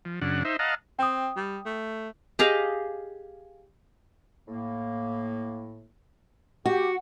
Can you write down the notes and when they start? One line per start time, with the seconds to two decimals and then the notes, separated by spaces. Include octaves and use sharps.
0.05 F3
0.21 F#2 C#3 D4 F#5
0.45 D#4 C5 E5
0.59 D#5 F5 F#5 A5 A#5
0.99 C4 G5 D#6
1.37 G3
1.66 A3
2.39 G4 G#4 D#5 F5
4.48 A2 A#3
6.66 F#4 G4